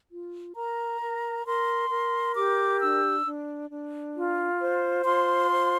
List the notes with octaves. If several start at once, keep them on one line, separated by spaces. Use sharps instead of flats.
F4
A#4 A#5
A#4
A#4 C6
A#4
G4 D6
D4 E6
D4
D4
F4
C5
F4 C6
C5